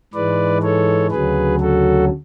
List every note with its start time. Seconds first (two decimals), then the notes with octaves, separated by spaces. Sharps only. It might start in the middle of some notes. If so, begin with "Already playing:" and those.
0.14 G#2 E3 G#3 B4 D5
0.62 A4 C#5
1.11 D2 C#3 F#3 G#4 B4
1.60 F#4 A4